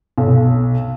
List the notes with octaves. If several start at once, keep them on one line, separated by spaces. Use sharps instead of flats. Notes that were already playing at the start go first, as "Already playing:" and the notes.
B1